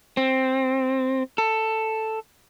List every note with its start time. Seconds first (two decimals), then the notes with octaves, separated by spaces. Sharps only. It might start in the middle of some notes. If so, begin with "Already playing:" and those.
0.17 C4
1.38 A4